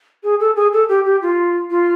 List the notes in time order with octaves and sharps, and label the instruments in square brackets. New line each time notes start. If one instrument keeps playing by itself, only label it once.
[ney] G#4
A4
G#4
A4
G4
G4
F4
F4